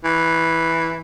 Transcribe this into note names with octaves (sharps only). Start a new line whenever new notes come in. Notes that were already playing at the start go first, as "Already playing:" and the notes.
E3